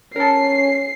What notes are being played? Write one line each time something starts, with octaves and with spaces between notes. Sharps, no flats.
C#4 A#4 A5 C7